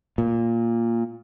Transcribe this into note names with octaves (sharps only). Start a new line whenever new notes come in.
A#2